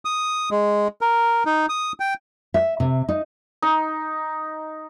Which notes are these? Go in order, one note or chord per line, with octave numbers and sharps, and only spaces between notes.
D#6
G#3
A#4
D#4
D#6
G5
E5
C3
D#4
D#4